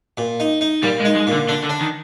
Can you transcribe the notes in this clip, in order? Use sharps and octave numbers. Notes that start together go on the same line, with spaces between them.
A#2
D#4
D#4
A#2 G3
G#3
D#4
G#3
A#2
D3
D3 D4
D3
D4
D#3